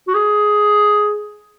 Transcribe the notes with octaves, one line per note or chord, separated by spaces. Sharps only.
F#4
G#4